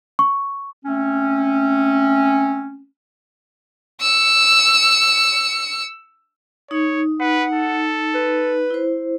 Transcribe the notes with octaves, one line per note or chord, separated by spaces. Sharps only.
C#6
A3 C4 C#4
E6 C#7
D#4 C#5
B4 F#5
A4
B4
E4 C5